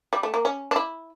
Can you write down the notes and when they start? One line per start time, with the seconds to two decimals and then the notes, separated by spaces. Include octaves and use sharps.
0.13 G3
0.23 A3
0.34 A#3
0.45 C#4
0.71 D4
0.76 E4